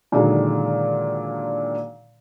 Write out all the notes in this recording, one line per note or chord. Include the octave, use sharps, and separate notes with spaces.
A#2 D3 D#3 F#3 G#3